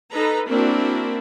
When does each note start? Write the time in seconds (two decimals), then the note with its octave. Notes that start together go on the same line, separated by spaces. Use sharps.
0.12 D#4 A4 B4 A#5
0.49 A#3 C4 D4 E4 F#4 A#4